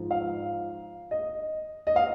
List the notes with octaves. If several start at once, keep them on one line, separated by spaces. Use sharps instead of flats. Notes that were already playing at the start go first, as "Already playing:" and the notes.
Already playing: G#2 F3
F5
D#5
D#5
F5